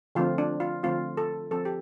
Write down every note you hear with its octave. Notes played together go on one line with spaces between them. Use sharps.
D3 F3 A3 C4 F4
D4
F4
D3 F3 A3 C4 F4
A4
F3 C4 A4
G4